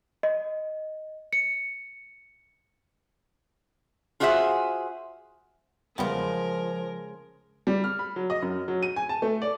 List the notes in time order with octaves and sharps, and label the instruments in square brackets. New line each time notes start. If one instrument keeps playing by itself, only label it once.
[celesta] D#5
C#7
[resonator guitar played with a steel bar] F4 F#4 G#4 C5 E5 F#5
[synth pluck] E2 G3 B3 [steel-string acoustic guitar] C#3 G#3 [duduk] F3 [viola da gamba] A#4
[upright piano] G3
F6
B5
F#3
D#5
F#2
F#3
D#7
G#5
A5
A3
D5